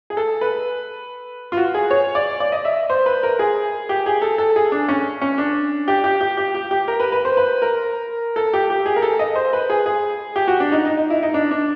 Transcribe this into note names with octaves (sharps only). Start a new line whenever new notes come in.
G#4
A4
B4
F4
F#4
G#4
C#5
D5
D5
D#5
E5
C5
B4
A#4
G#4
G4
G#4
A4
A4
G#4
D4
C#4
C#4
D4
G4
G4
G4
G4
G4
G4
A#4
B4
B4
C5
B4
A#4
A4
G4
G4
G#4
A#4
A4
D#5
C5
B4
G#4
G#4
G4
F#4
D4
D#4
D#4
D#4
E4
D#4
D4
D4